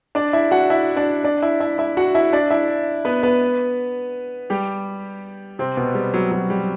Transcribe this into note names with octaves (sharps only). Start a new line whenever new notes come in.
D4 D5
E4 E5
F#4 F#5
E4 E5
D4 D5
D4 D5
E4 E5
E4 E5
E4 E5
F#4 F#5
E4 E5
D4 D5
E4 E5
B3 B4
B3 B4
G3 G4
C3 C4
B2 B3
G3
F#3
F#3
G3